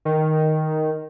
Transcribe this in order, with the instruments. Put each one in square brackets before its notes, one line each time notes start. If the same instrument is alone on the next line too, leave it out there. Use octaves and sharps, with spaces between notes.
[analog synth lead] D#3